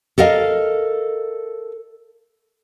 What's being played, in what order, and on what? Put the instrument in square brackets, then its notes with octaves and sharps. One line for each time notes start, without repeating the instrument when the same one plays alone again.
[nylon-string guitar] A4 A#4 D#5 F5